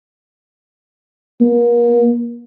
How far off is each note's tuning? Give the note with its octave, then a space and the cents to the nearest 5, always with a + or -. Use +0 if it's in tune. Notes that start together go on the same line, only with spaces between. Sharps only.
A#3 +35